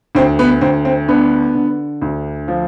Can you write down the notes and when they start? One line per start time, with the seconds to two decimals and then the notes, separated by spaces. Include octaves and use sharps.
0.15 D2 C4
0.39 B3
0.61 D2 C4
0.85 C4
1.08 D3 B3 D4
1.54 D3
2.02 D2
2.48 F3